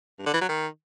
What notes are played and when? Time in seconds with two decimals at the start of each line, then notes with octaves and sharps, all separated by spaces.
0.19 G2
0.26 D3
0.34 E3
0.41 F#3
0.49 D#3